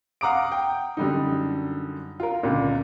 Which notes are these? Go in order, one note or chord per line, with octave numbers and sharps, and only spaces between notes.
F5 F#5 A#5 D6 D#6 D7
G5
F#2 D3 G3 D#4
F4 A#4
C#2 A#2 D3